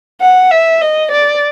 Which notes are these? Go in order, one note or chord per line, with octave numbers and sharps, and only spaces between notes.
F#5
E5
D#5
D5